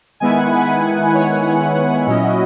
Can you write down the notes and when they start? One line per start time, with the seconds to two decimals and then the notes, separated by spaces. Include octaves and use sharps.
0.20 D#3 G#3 B3 E4 G#5
0.37 F#5
0.52 B4
1.14 C#5
2.07 A#2 F#3 C#4 E4 D#5
2.22 F#4